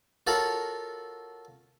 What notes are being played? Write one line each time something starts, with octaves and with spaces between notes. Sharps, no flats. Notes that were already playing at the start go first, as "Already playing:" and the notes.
F4 F#4 A4 A#4 C#5 F#5